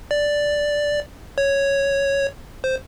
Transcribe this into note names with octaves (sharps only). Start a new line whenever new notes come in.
D5
C#5
C5